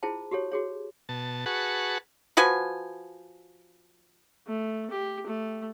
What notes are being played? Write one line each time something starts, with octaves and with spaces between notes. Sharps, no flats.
E4 F4 G#4 C5 A5
F#4 G4 A4 C#5
F#4 G#4 C#5
B2 A5
F#4 G#4 B4 F#5 A5 C#6
F3 F#4 B4 G#5
A3
G4
A3